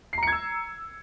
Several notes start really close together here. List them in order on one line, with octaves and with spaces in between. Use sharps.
C7 A#5 C#7 G#6 E6